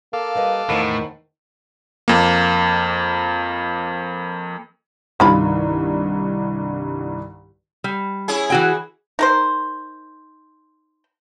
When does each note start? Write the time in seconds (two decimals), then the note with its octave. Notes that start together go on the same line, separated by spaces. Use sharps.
0.13 A#3 A4 F5 D6
0.35 G3 B4 D#5
0.70 E2 A2 D#3 C5 F#5
2.08 F2 A#3
5.20 C2 G2 D#3 A#3 F4 B5
7.84 G3
8.28 C#4 E4 G#4
8.50 E3 F#4 G5
9.19 D#4 A#4 C5